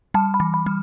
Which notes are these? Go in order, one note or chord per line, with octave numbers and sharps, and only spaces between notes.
G3 A5
B5
E3
B5
G3